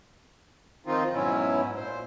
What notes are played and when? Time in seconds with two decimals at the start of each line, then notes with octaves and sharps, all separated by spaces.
0.87 D#3 F3 C4 D#4 F4
1.14 G#2 B2 F#3 C#4 E4
1.76 A#2 C5